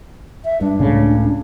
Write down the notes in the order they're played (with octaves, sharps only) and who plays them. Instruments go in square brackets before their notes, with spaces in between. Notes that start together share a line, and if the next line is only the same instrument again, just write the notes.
[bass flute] E5
[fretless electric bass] G2 [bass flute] D4
[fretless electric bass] C#2 A2 C#3